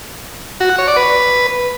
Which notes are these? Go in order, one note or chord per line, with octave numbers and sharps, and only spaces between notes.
F#4
F#5
C#5
D5
B4